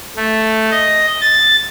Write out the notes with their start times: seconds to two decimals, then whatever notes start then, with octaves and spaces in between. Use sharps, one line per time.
0.16 A3
0.71 D#5
1.21 A6